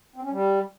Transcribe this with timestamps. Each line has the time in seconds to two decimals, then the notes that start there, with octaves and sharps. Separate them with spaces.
0.16 C4
0.23 C#4
0.30 G3